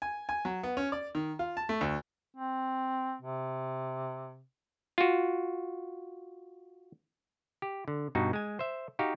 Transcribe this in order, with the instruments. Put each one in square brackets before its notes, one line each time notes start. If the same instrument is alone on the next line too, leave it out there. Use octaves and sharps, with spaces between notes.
[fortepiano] G#5
G#5
F#3
B3
C#4
D5
D#3
F4
A5
A3
D2
[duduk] C4
C3
[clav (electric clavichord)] F4 F#4
G4
D3
G2 B2 D#4 F#4
G#3 G#5
C5 E5
D#4 F#4 G4 F5